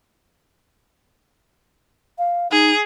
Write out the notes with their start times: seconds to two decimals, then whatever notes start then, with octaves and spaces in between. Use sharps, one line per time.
2.18 F5
2.51 D#4 G#4